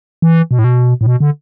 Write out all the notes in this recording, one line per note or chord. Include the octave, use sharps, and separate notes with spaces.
E3
B2
A2
B2
A2
B2
D3